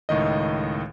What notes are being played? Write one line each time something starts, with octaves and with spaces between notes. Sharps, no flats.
C#2 A2 D#3 D#5